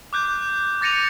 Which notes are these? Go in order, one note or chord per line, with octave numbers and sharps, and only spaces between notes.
D6 F#6 G6
D6 A6 A#6 C#7 D#7 F7